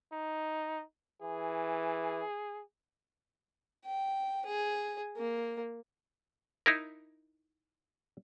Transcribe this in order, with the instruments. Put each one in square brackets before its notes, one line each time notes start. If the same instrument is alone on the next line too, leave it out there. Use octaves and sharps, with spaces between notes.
[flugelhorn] D#4
[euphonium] E3 [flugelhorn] G#4
[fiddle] G5
G#4
A#3
[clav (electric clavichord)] D#4 E4 A#4